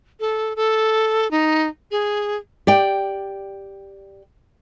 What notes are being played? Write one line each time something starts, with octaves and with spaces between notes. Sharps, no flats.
A4
A4
D#4
G#4
G4 D5 G5